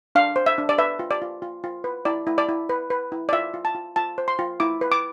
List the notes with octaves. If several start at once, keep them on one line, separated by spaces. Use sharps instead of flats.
D4 F5
C5
E5
D4
D5
B4 E5
F4
D5
F4
F4
F4
B4
E4 D5
E4
D5
E4
B4
B4
E4
D5
F4 E5
F4
A5
F4
F4 A5
C5
C6
F4
E4 D6
B4
D6